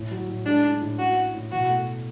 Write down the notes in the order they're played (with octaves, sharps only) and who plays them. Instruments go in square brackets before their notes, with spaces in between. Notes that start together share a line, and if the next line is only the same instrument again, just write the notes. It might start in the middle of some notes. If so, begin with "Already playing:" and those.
Already playing: [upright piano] A2
F#3
A2
[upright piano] G#3 [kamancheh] D4
[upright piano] D4
A2
[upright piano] C#4 [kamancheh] F#4
[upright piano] E4
A2
[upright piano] B2 [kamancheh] F#4
[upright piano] A3